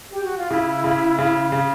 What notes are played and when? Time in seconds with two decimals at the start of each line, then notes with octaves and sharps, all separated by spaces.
0.12 G4
0.24 F#4
0.38 F4
0.50 C#3 E4
0.84 C#3
1.19 C#3
1.52 C#3